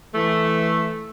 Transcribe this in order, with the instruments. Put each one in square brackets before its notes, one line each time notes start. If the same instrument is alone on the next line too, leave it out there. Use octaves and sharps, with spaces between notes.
[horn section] E3 A3